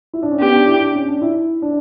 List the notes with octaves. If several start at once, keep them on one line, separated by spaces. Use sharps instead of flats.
E4
D4
C#4
B3 G4
D4
E4
D4
C#4
D4
E4
D4